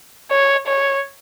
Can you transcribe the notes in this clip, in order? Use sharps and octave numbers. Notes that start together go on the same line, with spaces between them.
C#5
C#5